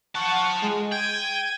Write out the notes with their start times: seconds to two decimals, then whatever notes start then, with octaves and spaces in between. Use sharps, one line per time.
0.15 F4 F#5 A5 C#6
0.62 G#3
0.92 G5 G#6 D#7